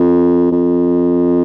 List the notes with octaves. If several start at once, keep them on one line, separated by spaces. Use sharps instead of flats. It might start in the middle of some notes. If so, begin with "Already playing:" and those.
Already playing: F2
F2